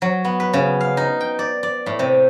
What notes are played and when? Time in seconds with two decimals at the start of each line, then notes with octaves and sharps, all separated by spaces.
0.02 F#3
0.25 B3
0.40 B4
0.53 C#3
0.81 F5
0.97 D#4
1.21 G5
1.39 D5
1.63 D5
1.86 A2
1.99 C3